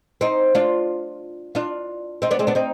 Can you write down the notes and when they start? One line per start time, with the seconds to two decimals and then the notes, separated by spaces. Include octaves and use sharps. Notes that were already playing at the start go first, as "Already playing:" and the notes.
0.21 C4 D#4
0.55 D4 F4
1.55 D4 F4
2.22 C4 D#4
2.31 B3 D4
2.39 G#3 C4
2.47 B3 D4
2.55 C4 D#4